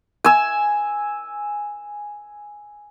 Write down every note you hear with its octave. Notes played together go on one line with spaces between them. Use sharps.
G#5 E6